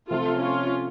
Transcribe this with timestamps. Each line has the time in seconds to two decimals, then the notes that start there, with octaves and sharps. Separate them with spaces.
0.10 C3 F3 A3 F4 A4
0.42 C#4 F4